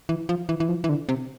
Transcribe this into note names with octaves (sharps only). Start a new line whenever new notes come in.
E3
F3
E3
E3
F3
E3
D3
C3